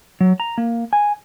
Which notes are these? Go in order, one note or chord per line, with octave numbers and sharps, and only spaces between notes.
F#3
A#5
A#3
G#5